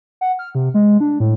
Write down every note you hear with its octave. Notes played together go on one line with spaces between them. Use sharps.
F#5
F6
C3
G#3
D4
A2